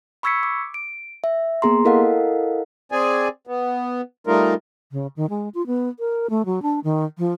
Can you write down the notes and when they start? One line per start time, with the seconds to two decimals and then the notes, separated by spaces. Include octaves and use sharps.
0.23 B5 C#6 E6 G#6 B6 C#7
0.43 D6
0.74 D7
1.24 E5
1.62 A#3 B3 G#4 A#5 C6
1.85 E4 A4 A#4 D#5 F5 F#5
2.92 C4 G#4 D5 G#5
3.47 B3
4.27 G3 A3 D#4 F4 A#4
4.92 C#3
5.16 D#3
5.30 G#3
5.54 F4
5.67 B3
5.99 A#4
6.30 A3
6.45 F#3
6.62 D4
6.84 D#3
7.18 F3